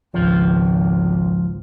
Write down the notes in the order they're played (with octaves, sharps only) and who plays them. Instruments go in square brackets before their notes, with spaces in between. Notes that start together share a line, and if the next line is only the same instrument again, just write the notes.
[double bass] G#1 C#2 [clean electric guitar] F3